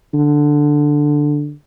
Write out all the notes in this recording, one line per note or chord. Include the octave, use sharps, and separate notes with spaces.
D3